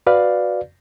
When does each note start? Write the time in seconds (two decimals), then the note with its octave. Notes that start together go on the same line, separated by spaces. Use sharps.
0.07 F#4 B4 D5 F5